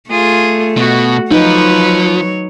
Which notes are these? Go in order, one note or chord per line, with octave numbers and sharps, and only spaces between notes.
A3 F4 G#4
B2 F#4
F3 F#3 D#4 B4 C#5